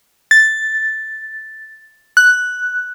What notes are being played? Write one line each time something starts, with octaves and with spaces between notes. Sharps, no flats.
A6
F#6